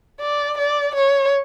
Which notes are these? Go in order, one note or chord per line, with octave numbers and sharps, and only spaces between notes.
D5
D5
C#5